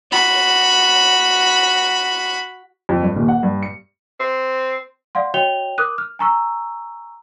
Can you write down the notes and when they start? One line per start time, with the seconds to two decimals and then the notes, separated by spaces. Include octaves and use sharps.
0.12 F#4 B5
2.89 F2
3.02 G2
3.16 D#1
3.28 F#5
3.43 G2
3.63 C#7
4.20 C4
5.15 D5 F5 F#5 C6
5.34 F#4 C#5 D#5 G5 F7 G7
5.78 A#4 D6 D#6 F#6 D#7
5.98 F6
6.19 G#5 A#5 C#6 E6